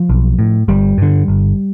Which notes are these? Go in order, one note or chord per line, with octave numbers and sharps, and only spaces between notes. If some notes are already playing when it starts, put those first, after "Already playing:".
Already playing: F3
B1
A2
G1 G3
G2 D3
G1